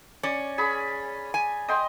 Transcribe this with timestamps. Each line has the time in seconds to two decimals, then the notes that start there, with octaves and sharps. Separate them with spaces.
0.23 C#4 D5
0.58 G#4 B5
1.34 G#5
1.68 D#5 G5 C6